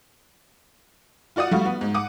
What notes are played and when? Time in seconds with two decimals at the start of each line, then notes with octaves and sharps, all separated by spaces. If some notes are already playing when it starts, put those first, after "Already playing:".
1.36 F4 F#4 D5 F#5 D#6
1.51 G3 A3 F#4 F5 C#6
1.65 B3
1.81 G#2
1.94 F#5 D6 D#6